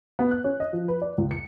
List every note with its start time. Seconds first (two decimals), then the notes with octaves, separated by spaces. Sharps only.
0.19 B3
0.31 F#6
0.44 C#4
0.60 D#5
0.73 F3
0.88 B4
1.02 D5
1.18 C#2
1.31 C#7